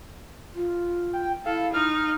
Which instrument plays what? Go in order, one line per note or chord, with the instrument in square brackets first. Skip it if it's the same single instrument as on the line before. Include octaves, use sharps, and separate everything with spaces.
[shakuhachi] F4
[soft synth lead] G5
[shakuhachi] E4 [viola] A4 [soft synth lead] F5
[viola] D#4 [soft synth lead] F6